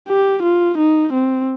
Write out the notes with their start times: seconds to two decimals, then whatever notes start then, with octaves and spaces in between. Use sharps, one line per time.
0.08 G4
0.43 F4
0.78 D#4
1.13 C4